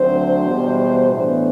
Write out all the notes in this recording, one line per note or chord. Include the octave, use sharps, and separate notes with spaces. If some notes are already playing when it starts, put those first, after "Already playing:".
Already playing: D2 D3 F#3 C4 C5
E2 B2 G3
A2 E3 B3 D4